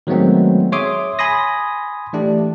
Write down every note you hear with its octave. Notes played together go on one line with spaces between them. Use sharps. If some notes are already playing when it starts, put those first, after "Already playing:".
D#3 F#3 G#3 A3 B3 C4
G#4 C#5 E5 C6 D6 D#6
G#5 B5 C6 D#6 A#6
E3 A3 D4 G4